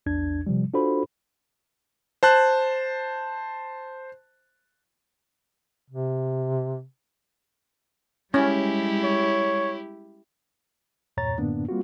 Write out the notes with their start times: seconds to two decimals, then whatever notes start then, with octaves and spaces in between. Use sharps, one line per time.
0.06 A#1 E2 D4 G#6
0.47 C3 F3 G3
0.74 D4 F4 F#4 A4 C5 B5
2.23 C5 A5 F#6
5.90 C3
8.34 G3 G#3 C#4 E4 G4
9.04 C#5
11.17 E2 G2 A#2 C#5 A#5 A6
11.38 F#2 A2 D3 A#3 B3 D4
11.69 G3 A#3 C4 F4 F#4